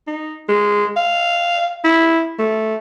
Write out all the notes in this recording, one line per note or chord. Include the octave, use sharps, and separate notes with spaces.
D#4
G#3
F5
E4
A3